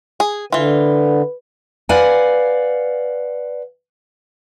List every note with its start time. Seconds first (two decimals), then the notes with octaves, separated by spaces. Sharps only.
0.20 G#4
0.52 D3 E3 F4 B4
1.89 B4 D5 F5 F#5 G#5